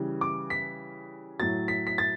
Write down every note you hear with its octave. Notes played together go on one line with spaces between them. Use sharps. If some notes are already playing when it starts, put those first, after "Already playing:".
Already playing: C#3 E3 G3
D6
B6
A2 F#3 A6
B6
B6
A6